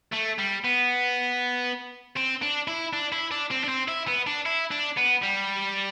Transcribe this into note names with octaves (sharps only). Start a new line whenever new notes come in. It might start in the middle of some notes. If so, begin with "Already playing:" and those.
A3
G3
B3
C4
D4
E4
D4
E4
D4
C4
D4
C4
E4
B3
D4
E4
D4
B3
G3